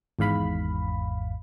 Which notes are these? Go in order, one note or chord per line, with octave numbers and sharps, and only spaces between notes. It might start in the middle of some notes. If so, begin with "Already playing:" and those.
G#1 E2 G#2 F5 B5